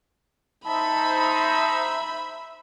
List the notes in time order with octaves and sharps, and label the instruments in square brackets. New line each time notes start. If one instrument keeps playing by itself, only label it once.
[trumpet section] D#4 C5 [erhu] E5 [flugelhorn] A5 [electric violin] B5